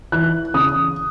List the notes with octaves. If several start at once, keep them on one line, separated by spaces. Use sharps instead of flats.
E3 F#6
C#3 D#6